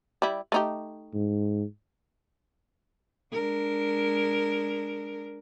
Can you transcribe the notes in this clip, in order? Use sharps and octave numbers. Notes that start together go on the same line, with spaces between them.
G3 E4
A3 D#4 G4
G#2
G#3 D4 A#4